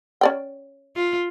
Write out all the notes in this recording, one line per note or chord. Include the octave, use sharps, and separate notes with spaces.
C#4 D5 G5
F4